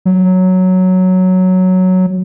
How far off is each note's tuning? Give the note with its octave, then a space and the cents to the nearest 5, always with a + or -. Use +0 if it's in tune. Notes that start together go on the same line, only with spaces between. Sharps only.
F#3 +0